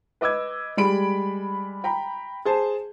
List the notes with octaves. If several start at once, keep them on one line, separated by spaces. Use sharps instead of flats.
B4 D#5 D6 E6 G#6
G3 G#3 B5 D7
G5 A#5 B5
G#4 C5 A5